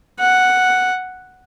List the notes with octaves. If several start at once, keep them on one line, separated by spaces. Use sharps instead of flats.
F#5